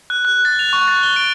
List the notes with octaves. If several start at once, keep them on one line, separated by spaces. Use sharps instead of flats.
F#6
F#6
A6
F7
C#6
A6
G7
D7